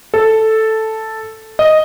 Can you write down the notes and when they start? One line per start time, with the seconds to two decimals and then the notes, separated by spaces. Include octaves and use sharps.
0.14 A4
1.59 D#5